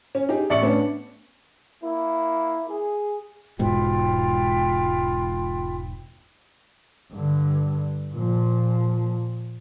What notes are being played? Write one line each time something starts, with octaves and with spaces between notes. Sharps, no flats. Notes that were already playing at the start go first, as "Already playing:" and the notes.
C#4
D#4 G4 G#4
A1 D5 E5 C#6 C#7 F#7
A2 B3 C#4 D4
A#3 E4
G#4
E1 G#2 B2 F4 G5 B5
G2 D3
A#2 F3